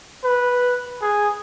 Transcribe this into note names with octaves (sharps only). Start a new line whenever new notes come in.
B4
G#4